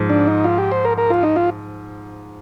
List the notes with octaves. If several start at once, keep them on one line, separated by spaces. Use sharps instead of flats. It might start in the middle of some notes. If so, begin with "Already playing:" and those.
Already playing: G#2 F3
D4
D#4
F4
G4
C5
A#4
A#4
F4
D#4
F4